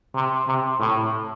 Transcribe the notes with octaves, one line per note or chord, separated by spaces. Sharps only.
C3
C3
A2